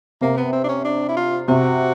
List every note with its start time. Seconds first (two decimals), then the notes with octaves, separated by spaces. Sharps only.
0.21 C3 A#3
0.37 B3
0.53 C4
0.64 D4
0.69 C#4
0.85 D4
1.09 E4
1.17 F4
1.48 C3 F#4